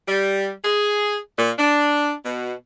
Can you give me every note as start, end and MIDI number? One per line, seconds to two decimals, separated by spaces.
0.08 0.51 55
0.64 1.18 68
1.38 1.50 46
1.58 2.13 62
2.25 2.53 47